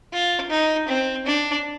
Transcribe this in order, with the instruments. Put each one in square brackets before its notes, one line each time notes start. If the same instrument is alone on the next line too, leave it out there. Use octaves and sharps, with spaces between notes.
[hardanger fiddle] F4
D#4
C4
D4